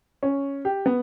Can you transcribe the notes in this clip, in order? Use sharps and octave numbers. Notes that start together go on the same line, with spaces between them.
C#4
G4
B3